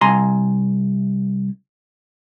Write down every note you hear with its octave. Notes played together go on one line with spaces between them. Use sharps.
C2 G#5 A#5 C6